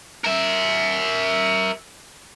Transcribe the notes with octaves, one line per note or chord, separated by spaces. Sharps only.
A#4 E5